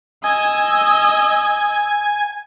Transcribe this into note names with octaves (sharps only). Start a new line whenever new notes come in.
D#5 G#5 E6